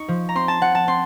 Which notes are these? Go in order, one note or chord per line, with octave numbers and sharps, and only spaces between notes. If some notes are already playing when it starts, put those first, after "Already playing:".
Already playing: D#4 C#6
F3
A#5
C4 C6
A5
C4 F#5
A5
C4 C6